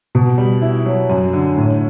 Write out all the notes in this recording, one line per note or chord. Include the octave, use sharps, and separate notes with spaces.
B2
G3
E4
F#3
F#2
D3
A2